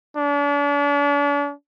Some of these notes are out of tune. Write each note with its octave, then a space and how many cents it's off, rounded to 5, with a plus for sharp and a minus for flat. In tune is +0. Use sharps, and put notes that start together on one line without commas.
D4 -40